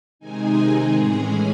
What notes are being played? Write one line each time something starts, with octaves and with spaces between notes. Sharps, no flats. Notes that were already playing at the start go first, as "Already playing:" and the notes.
C3 D#3 G#3 C4 D#4 G#4 G#5
A2 E3 G#3 C#4